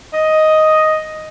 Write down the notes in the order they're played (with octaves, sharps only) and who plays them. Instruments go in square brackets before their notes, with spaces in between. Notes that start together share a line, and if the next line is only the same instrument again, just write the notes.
[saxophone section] D#5